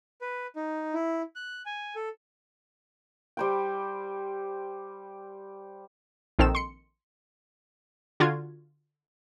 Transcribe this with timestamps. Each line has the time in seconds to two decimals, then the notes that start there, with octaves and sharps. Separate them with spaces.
0.21 B4
0.56 D#4
0.94 E4
1.36 F#6
1.66 G#5
1.96 A4
3.37 G3 C5 G5
6.39 A#1 D#3 C4 A4 E6 E7
6.55 C6 C#7
8.20 D3 F4 F#4 G#6